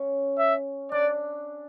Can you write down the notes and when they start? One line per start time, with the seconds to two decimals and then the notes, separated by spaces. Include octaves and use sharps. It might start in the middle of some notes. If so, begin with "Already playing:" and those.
Already playing: C#4
0.39 E5
0.92 D4 D5